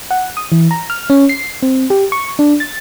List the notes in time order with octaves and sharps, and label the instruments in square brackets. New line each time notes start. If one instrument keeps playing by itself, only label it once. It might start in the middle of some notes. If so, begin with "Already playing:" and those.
[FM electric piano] F#5
D#6
E3
A#5
F6
C#4
C7
C4
G4
C#6
D4
A6